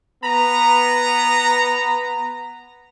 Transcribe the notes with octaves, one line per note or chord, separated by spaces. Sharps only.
B3 B4 A#5